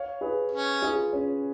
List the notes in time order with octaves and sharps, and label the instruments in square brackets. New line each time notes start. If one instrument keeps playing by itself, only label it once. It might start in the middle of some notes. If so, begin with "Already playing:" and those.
Already playing: [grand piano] C#5 F5
G#4 B4
[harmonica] C#4
[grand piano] F4 G#4
C#4